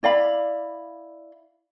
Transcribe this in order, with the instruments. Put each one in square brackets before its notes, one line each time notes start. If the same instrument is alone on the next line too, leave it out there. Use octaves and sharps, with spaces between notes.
[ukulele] E4 D5 F5 B5